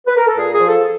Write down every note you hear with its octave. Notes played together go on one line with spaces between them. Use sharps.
B4
A#4
A4
A#2 G#4
G#4
F3
A4